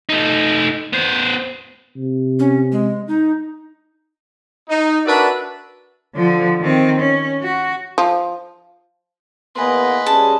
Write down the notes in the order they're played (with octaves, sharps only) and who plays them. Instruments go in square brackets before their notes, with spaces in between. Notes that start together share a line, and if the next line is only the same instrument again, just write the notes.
[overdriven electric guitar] A3 D#4
B3 C5
[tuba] C3
[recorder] C#4
G#3
D#4
[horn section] D#4
D4 F#4 A#4 B4 D5 E5
[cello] D3 F3
D#3 C4
C#4
F#4
[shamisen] F3
[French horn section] E2 A#3 B3 [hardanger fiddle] B4 D#5 [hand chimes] G#5 C6
[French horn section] G3 C#4 G#4 [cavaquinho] A5